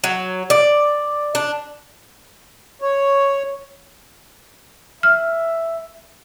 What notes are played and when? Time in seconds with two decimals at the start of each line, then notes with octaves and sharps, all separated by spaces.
0.04 F#3
0.50 D5
1.35 D4
2.82 C#5
5.03 E5 F6